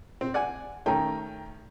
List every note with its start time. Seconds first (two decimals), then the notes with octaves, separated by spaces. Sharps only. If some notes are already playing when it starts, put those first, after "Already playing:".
0.21 C4
0.34 D5 F#5 G#5
0.86 D#3 A3 C#4 G5 A#5